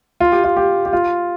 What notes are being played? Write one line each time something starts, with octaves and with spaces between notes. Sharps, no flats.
F4
G4
F4
G4
G4
F4